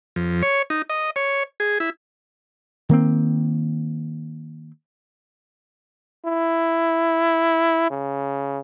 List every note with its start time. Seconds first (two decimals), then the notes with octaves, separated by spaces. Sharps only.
0.16 F2
0.42 C#5
0.70 D#4
0.90 D#5
1.16 C#5
1.60 G#4
1.80 E4
2.89 D#3 A#3 C4
6.25 E4
7.90 C#3